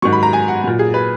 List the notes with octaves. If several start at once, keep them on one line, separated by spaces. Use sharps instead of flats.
G#2 D#3 F#3 C#6
B5
A#5
G#5
F#5
A#2 F#3
G#4
B4